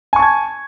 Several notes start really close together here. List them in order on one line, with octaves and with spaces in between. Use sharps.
G#5 C#6 A5 G#6